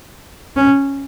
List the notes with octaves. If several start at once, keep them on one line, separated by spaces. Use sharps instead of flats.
C#4